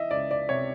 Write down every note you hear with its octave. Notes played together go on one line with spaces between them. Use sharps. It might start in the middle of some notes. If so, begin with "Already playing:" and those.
Already playing: E3 D#5 E5
C#2 D5
D5
C3 C#5